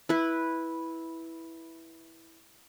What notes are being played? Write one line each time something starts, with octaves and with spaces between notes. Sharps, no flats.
E4 B4